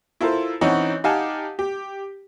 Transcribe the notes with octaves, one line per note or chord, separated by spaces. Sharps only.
E4 F4 A4 A#4 C5
E3 C4 C#4 D#4 C#5 F#5
D#4 G4 F5 F#5 G#5 A5
G4